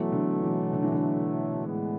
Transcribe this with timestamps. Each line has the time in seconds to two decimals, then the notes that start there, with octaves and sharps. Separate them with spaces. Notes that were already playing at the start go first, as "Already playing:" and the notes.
Already playing: B2 E3 F#3 A3
0.12 D3
0.42 E3
0.73 D3
0.83 E3
0.92 D3
1.65 A2 G#3 B3